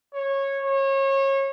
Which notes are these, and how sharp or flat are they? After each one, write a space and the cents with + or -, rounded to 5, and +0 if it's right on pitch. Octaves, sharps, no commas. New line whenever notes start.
C#5 -15
C#5 -30